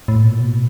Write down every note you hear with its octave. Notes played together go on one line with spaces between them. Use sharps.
A2
A#2
B2